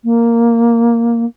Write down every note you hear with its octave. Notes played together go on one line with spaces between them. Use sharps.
A#3